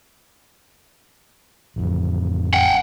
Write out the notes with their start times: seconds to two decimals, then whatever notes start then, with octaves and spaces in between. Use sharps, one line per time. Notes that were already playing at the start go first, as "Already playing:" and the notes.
1.76 A1 F2
2.54 F#5 G5